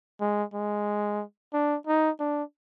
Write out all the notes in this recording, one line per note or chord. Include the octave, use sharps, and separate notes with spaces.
G#3
G#3
D4
D#4
D4